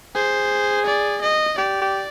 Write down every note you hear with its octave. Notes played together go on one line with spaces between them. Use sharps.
G#4 C5
D5
D#5
G4 D5
G4